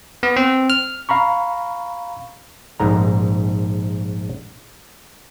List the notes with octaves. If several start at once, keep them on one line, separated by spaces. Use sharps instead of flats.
B3
C4
F6
F5 A#5 B5 C#6
A#1 G#2 A#5